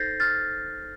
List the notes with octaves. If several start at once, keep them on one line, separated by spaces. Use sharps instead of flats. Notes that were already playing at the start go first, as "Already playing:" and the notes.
Already playing: D#4 A4 C5 G6 A6 A#6 C7
F6 A6